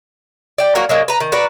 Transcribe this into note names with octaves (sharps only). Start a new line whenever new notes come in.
D5 G5
F#3 A#3 F#4 A#4
F#3 G#3 A#3
B4 A#5
D#3
F#4 A#4 B4 D5